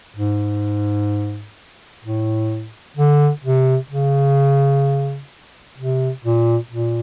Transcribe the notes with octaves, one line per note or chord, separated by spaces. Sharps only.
G#2
A2
D3
C3
C#3
C3
A#2
A#2